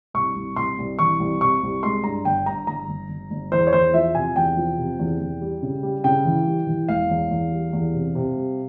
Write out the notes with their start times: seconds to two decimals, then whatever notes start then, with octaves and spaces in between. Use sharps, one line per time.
0.14 C2 C#6
0.36 C2
0.56 C2 C6
0.78 C2
0.99 E3 C#6
1.20 C2
1.41 C3 C#6
1.63 C2
1.83 G#3 C6
2.04 G2 A#5
2.25 G1 G5
2.46 G2 A#5
2.67 G1 A#5
2.88 G1
3.09 G1
3.31 G1
3.52 E2 C5
3.67 C#5
3.72 E2 C5
3.94 F3 E5
4.15 C3 G#5
4.36 E2 G5
4.57 F3
4.78 C3
4.99 E2
5.20 E2
5.41 G3
5.62 C#3
5.83 G3
6.04 C#3 G5
6.25 E3
6.46 G3
6.67 E3
6.88 E1 F5
7.10 E2
7.31 E2
7.52 G3
7.73 E2
7.94 C3
8.15 C3
8.36 G3